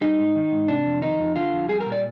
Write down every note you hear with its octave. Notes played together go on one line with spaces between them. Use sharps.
G3 D#4
G#2
D#3
G#2
C3 D4
F2
D#3 D#4
F2
D3 F4
F2
G3 G#4
A#4
A#2
D5